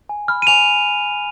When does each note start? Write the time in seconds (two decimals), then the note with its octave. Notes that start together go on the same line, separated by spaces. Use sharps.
0.09 G#5
0.28 B5 F6
0.42 D#7
0.47 G#5 F7